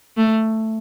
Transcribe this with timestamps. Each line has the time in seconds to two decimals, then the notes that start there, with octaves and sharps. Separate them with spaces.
0.17 A3